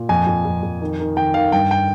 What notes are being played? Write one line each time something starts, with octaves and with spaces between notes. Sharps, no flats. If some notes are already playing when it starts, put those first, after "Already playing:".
Already playing: A#2
F2 G#5
F2
F2
F2
D#3
D#3
D#3 G5
D#3 F5
G2 G5
G5